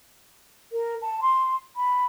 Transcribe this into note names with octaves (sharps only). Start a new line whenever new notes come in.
A#4
A5
C6
B5